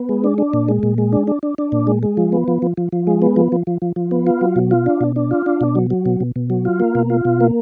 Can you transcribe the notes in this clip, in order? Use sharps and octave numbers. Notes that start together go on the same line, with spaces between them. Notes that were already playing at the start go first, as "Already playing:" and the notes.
Already playing: B3
G#3
D4
D4
A#2
G#3
A#2
G#3
D4
D4
D4
D4
A#2
G#3
G#3
F3
B3
F3
F3
F3
F3
G#3
B3
F3
F3
F3
F3
F3
B3
F4
F#3
B2
F4
D4
B2
D4
F4
D4
B2
F#3
F#3
B2
B2
B2
F#3
F4
A#3
B2
F4
B2
A#3